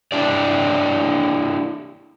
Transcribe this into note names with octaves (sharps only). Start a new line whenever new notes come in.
D4 E4 G4 D5